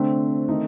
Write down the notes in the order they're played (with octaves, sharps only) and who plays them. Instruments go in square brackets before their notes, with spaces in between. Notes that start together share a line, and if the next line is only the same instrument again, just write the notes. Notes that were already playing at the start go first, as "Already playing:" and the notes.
Already playing: [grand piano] D3 A3 D4 [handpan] C4
[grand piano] D#3 A3 D#4